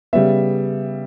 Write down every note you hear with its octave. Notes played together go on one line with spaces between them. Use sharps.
C#3 G3 B3 E5